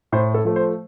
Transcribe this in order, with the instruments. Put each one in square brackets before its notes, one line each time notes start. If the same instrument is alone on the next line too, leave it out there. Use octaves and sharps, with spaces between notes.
[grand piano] A2 C5
A4
F3 A3
C5